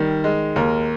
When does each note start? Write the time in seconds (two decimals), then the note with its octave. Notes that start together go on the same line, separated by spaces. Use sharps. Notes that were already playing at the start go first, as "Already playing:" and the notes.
Already playing: D#3 G3
0.24 G#3
0.56 D#2 A#4